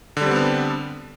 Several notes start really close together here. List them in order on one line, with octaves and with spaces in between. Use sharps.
D3 G3 C4 B3 D4